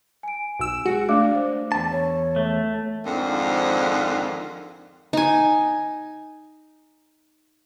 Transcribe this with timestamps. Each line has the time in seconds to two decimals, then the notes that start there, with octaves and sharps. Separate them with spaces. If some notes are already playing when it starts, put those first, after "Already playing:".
0.23 G#5 D7
0.59 B1 E6
0.85 G#3 F#4
1.09 A3 D4 D5 D6
1.35 C5 D6
1.72 E2 A5
1.92 C#5
2.36 A3
3.04 F2 G#2 D3 D#3 F3
5.13 D#4 G#5